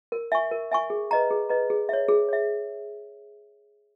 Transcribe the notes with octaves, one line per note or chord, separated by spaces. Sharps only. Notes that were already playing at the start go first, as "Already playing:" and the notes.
A#4
E5 G#5 C#6
A#4
E5 G#5 C#6
G#4
B4 D#5 A#5
G#4
B4 D#5 A#5
G#4
C#5 E5
G#4
C#5 E5